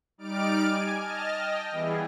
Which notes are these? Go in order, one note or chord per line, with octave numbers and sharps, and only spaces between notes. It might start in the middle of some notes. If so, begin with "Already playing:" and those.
G3 D#4 D5 D6 F6 D7
G#5
D#5 A5 F6
D#5 G5
E3 G3 B3 E4 G#4